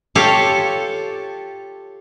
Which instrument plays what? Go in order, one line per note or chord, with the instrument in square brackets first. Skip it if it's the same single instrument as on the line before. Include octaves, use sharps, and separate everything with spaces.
[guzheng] F4 G4 A4 C#5 F5